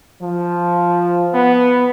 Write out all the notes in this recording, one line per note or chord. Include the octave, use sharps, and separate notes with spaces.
F3
B3